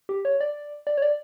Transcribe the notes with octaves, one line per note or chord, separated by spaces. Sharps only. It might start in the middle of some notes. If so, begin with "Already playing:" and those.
G4
C#5
D5
D5
C#5
D5